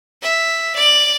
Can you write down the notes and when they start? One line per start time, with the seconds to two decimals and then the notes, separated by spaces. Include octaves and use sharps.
0.22 E5
0.75 D5